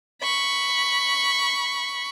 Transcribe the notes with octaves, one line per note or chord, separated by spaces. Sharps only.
B5 C#6